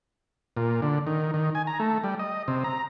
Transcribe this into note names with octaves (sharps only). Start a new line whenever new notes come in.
A#2
D3
D#3
D#3
G#5
A#5
A3
G3
D#5
C3
A#5